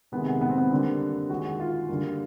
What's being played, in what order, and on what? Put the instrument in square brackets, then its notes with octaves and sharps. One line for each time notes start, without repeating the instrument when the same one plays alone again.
[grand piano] C3 D#3 G#3 B3
B3
B3
C4
B3
D3 G3 A#3 C4
D#3 G#3 F#4
F4
D3 G3 A#3